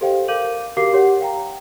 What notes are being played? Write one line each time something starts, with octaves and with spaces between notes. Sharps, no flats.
G4 A4 C5 D#5 F5 G5
A#4 F5 D6 G6 D#7 F#7
F#4 G4 A#4 F5 D6 C7
G4 C#5 F#5
F5 G5 A#5